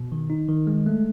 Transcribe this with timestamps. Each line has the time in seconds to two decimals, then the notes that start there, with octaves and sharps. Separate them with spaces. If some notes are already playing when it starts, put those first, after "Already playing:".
Already playing: B2
0.12 D#3
0.30 D#4
0.49 D#3
0.67 G#3
0.86 A3